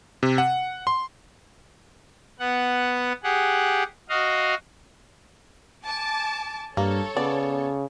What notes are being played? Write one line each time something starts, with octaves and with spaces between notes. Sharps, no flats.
C3
F#5
C6
B3 F#5
G4 G#4 F#5
F#4 D#5 F5
G#5 A5 D6
G2 A#3 A4 C#5
C#3 B3 D5